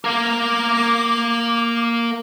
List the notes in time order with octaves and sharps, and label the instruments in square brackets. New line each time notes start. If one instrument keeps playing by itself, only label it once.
[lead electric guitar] A#3 A#4 [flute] D6